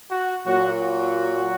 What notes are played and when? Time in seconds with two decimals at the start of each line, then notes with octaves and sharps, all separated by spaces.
0.10 F#4
0.46 A#2 F#3 F#4
0.82 F#4